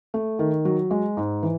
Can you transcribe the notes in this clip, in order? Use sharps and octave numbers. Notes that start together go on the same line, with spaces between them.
A3
D#3
F#3
G#3
G#2
E3